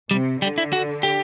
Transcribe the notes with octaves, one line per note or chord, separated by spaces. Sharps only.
C3 G3
D3 G3
E4
F#4
G4